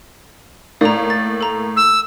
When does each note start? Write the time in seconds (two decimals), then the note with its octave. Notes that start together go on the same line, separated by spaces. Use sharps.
0.81 A2 A#3 D5 A#5
1.10 A6
1.41 A4 A#5
1.77 E6